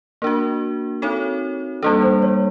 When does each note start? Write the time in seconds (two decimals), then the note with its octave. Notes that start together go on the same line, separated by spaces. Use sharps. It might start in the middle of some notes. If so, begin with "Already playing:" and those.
0.22 A#3 D4 F#4 A#4
1.02 C4 D#4 F#4 A4 C#5
1.83 G3 A#3 D4 A4
2.02 C5
2.22 C#5